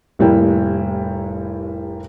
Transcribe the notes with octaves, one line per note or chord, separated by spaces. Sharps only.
F1 A2 G3 A#3 E4 G5